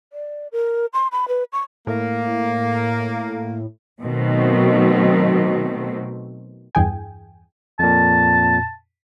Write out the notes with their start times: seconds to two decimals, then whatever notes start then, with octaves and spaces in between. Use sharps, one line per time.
0.13 D5
0.52 A#4
0.93 C6
1.12 B5
1.28 B4
1.53 C#6
1.87 A2 A#3
4.01 B2 D#3 F#3 A3 C4
6.75 E2 G2 E3 G#4 G5 G#5
7.79 F2 A#2 A5